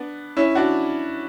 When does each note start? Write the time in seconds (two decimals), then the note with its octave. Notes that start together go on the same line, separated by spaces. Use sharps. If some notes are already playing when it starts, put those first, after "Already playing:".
Already playing: B3 D4
0.37 C#4 E4
0.55 D4 F#4